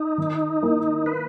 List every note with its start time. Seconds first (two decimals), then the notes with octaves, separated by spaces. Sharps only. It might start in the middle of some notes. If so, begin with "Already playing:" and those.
Already playing: D#4
0.18 D#3
0.62 A#3 E4 A#4
1.06 B4